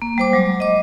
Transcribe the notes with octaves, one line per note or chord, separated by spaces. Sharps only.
A#3
G3 C5 D6
F#3 G#3
D#5 D6